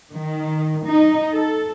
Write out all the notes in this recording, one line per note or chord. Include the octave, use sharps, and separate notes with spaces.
D#3
D#4
A4